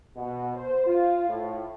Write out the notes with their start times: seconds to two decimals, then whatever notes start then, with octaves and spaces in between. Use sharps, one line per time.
0.16 B2
0.55 C5
0.87 F4
1.28 A2